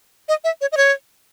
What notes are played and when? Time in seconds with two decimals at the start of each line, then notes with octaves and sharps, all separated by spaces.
0.28 D#5
0.44 E5
0.61 C#5
0.72 D#5
0.77 C#5